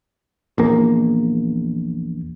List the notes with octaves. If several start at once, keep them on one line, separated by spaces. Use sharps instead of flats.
A#1 E2 A#3